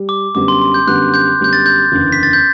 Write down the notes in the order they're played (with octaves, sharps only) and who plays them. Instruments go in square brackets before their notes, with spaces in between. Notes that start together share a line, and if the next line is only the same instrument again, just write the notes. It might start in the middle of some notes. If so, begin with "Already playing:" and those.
Already playing: [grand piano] G3
[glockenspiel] D6
[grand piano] F#2 D3 G3 B3 [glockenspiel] D6
[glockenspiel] C6
C6
G6
[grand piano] F#2 D3 G3 B3 [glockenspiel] F#6
[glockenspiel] G6
[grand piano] F#2 D3 G3 B3 [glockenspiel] G6
[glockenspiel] A6
G6
[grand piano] F#1 E2 D3
[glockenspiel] B6
A6
G6